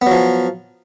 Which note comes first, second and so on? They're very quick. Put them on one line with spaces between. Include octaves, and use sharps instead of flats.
B3 F#3 F3